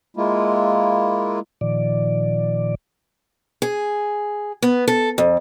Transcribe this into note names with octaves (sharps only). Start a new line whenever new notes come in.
G#3 A#3 E4 F4
A#2 D#3 F3 D5
G#4
B3
A4
F2